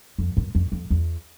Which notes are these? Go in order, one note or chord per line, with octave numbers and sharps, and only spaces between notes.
F2
F#2
F2
F2
E2